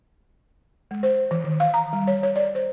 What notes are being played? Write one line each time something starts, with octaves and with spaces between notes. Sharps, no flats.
G#3
C5
E3
D#3
F5
A#5
G3
C#5
C#5
D5
C5